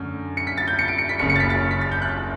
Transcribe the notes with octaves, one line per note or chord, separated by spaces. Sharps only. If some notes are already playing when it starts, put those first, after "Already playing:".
Already playing: F#2 D3 A3 C#4
C#7
B6
A6
G6
C#7
D7
C#7
B6
F#1 F#2 C#3 C#7
C#7
A6
B6
A6
B6
A6
G6
F#6